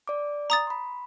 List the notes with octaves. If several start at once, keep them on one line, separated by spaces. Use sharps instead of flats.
D5 D6
A#5 D#6 A6
B5 C6